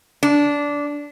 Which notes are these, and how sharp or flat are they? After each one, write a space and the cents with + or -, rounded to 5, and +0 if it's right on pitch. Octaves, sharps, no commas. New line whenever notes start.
D4 -15